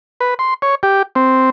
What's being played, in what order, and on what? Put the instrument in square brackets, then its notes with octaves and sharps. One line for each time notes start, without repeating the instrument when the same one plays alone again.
[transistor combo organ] B4
C6
C#5
G4
C4